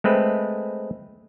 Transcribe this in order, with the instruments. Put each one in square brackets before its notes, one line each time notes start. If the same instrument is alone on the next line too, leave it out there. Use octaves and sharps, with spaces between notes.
[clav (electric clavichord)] G#3 A3 C4 B4